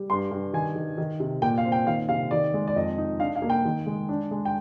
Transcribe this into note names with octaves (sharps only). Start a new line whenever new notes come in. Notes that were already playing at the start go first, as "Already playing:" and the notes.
Already playing: G3
G2 C6
G2
D#3 G#5
D#3
D#3
C3
A#2 G5
F5
C4
G5
D#3 F5
C3 F5
D#3 D5
G#3
D5
F2 D#5
D#4
D4 F5
F5
A#3
G5
D#3
G#3
D4
G#3
G5